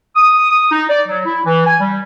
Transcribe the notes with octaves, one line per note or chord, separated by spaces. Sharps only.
D#6
D#4
D5
F#3
E4
E3
G#5
G3